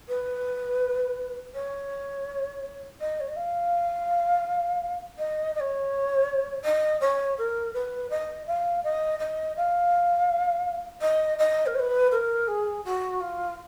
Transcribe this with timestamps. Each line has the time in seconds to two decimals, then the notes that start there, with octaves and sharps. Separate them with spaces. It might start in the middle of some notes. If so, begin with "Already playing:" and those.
0.08 B4
1.55 C#5
3.00 D#5
3.20 C#5
3.28 D#5
3.36 F5
5.19 D#5
5.55 D#5
5.60 C#5
6.64 D#5
7.01 C#5
7.38 A#4
7.74 B4
8.10 D#5
8.47 F5
8.84 D#5
9.19 D#5
9.57 F5
11.02 D#5
11.39 D#5
11.66 A#4
11.75 C#5
11.79 B4
12.11 A#4
12.48 G#4
12.85 F#4
13.20 F4